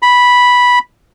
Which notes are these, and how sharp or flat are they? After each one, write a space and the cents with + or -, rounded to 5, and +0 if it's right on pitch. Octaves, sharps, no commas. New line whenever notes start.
B5 -5